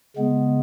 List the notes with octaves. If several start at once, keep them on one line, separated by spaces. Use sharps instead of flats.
C#3 G#3 B3